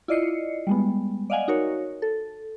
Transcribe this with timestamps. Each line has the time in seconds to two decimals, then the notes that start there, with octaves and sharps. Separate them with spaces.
0.08 E4 F4 D5 D#5 C7 C#7
0.67 G3 G#3 B3
1.30 D5 D#5 F5 F#5 G#5
1.48 D#4 F#4 A#4 C#5
2.02 A4